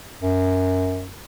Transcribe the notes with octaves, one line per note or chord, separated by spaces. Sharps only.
F#2